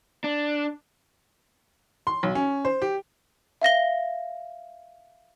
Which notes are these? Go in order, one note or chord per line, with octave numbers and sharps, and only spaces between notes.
D4
C6
B1
C#4
C5
G4
E5 F5 A#6 G7